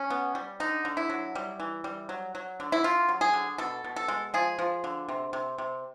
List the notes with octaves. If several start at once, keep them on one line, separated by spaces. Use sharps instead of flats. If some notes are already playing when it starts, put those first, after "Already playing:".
Already playing: C#4
B3
G3
D3 D#4
D3
E4
F#3
G3
E3
G3
F#3
F#3
D3
E4
D3 F4
F#3
G#4
D3
B2 A4
B2
A4
G#3
F3 G#4
F3
D3
C3
C3
C3